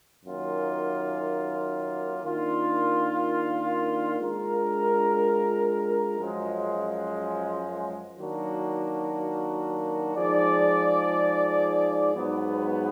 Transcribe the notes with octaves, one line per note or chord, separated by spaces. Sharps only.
F#2 D#3 A#3 F4
D#3 A#3 D4 F4
G#3 D4 F4 A#4
F#2 F3 G#3
D#3 F#3 A#3 D4 F#4
F3 G#3 D#4 G#4 D5
G#2 F#3 B3